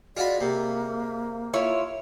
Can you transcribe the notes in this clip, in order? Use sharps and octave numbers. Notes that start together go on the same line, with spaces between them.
G#3 F4 F#4 D5 B5
C3 A#3
E4 F4 C#5